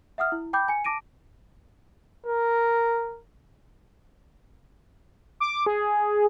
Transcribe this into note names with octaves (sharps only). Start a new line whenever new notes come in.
E5 F#5 D#6 F6
E4
G5 B5 D6 G6
G#5 C#7
A5 D6 A#6 D7 D#7
A#4
D6
G#4